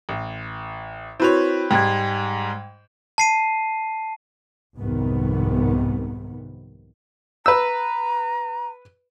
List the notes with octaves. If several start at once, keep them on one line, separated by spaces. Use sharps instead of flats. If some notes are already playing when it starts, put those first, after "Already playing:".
A1
C4 E4 F#4 B4 C#5 F7
G#2 G3 G#3 G5 G#6
A5 C7 D#7
C2 F2 G#2 C3 D#3 B3
B4 A#5 E6